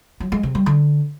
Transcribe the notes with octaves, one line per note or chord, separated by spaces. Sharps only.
F#3
G#3
C3
G3
D3